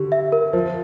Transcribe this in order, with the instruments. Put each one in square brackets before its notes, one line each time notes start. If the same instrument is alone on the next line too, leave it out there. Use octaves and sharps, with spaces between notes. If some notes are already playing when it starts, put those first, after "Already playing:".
Already playing: [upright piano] D3 [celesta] G4
[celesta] E5
A#4
[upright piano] F3 [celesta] C5